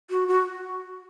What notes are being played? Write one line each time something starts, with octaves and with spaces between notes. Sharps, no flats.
F#4
F#4